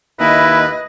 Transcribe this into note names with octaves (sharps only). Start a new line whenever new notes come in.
D#2 E4 B4 D#5